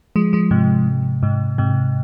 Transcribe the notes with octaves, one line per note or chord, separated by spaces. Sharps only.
F3 G#3
F3 G#3
G#2 C3
G#2 C3
G#2 C3